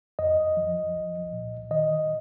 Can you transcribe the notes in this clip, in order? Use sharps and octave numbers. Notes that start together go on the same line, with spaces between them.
F2 D#5
F3
C2
A#2
D#3 D#5